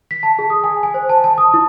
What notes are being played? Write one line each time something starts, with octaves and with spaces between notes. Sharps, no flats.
B6
A5
G#4
D#6
G#5
G#5
C5
A5
A5
D#6
E4